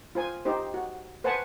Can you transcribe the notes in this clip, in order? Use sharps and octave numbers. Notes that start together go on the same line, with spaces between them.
F4 C5 G#5
D#4 G4 C5
F#4
B4 C5 F#5 G#5 A5